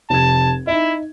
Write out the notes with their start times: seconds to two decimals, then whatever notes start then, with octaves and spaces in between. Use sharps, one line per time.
0.10 F1 A5 G#6
0.67 D#4 E4 E5